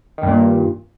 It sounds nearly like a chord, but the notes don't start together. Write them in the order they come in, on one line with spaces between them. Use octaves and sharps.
D#3 G2 A#2